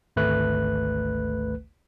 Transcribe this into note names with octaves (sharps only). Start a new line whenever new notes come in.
G#1 D2 A3 B4 F#6